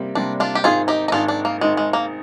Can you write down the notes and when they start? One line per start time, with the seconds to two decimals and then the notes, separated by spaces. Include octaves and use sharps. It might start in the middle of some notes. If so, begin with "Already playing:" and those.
Already playing: C3 G3 A#3
0.15 C3 G3 A#3 D4
0.40 D4 F4
0.55 G4
0.64 G#1 G#2 D#3 F4 G#4
0.88 D#4 G4
1.08 D#4
1.12 G#1 G#2 D#3 D4 F4
1.28 D4
1.45 A#3
1.61 G#1 G#2 D#3 G#3
1.77 G#3
1.93 A#3